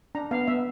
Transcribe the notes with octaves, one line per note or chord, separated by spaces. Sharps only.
D4 A#5
B3 F5
B3 E5